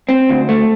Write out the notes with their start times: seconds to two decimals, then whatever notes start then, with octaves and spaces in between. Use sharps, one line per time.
0.09 C4
0.29 D2
0.49 A3